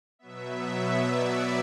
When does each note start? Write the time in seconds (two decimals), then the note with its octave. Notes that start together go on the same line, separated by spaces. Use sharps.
0.19 B2 F#3 B3 E5
1.03 D5